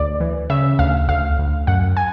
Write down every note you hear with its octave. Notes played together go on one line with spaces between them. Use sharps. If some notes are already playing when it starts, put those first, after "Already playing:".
Already playing: D2 D5
E3
C#3 E5
D2 F5
D2 F5
D2
F#2 F#5
G#5